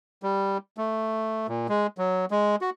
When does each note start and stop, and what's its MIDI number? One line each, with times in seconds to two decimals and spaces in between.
0.23 0.58 55
0.78 1.47 57
1.49 1.67 46
1.69 1.87 56
1.98 2.25 54
2.31 2.56 56
2.61 2.70 66